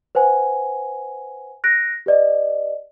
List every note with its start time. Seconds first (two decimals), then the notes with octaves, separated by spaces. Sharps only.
0.15 B4 C5 F#5 G#5
1.64 F#6 A#6 D7
2.06 G4 B4 D5 D#5